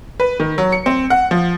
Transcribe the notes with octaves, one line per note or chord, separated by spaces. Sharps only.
B4
D#3
F#3
C#7
C4
F#5
F3